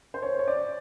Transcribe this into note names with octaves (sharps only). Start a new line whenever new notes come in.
C5
C#5
C#5
D5